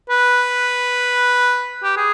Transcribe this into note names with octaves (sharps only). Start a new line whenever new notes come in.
B4
G4
G#4